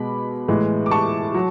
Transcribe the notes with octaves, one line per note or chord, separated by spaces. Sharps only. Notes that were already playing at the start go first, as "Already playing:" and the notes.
Already playing: B2 G#3 B5 D6
A2 E3 G#3
D6
A5 C#6
F#3